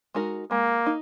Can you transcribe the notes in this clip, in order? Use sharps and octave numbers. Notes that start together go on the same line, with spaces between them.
G#3 D#4 F#4 A#4
G#3 A#3
D#4